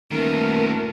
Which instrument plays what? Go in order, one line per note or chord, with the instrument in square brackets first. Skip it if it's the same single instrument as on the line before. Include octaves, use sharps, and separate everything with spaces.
[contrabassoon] D#1 [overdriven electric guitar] D#3 B3 [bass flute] A3 [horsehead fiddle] A#4